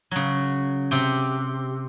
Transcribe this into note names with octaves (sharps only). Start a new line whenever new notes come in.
C#3 F#3
C3 G4